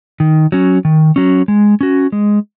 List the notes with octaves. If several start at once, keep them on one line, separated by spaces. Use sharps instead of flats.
D#3
F#3 C#4
D#3
F#3 C#4
G#3
C#4 F#4
G#3